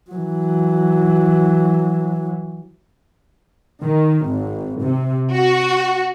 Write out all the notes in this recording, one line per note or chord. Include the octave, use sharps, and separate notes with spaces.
E3 F#3
D#3
G#1
C3
F#4